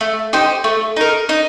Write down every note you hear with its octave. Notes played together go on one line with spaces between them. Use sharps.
A3
D#4 G4 C5
A3
D#4 A#4
D#4